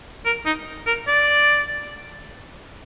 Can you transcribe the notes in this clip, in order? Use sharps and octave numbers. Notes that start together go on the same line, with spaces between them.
A#4
D#4
A#4
D5